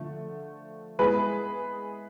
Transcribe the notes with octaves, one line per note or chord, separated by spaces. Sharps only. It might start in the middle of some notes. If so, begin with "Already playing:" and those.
Already playing: D3 F3 A3
G#3 B3 E4 G#4 B4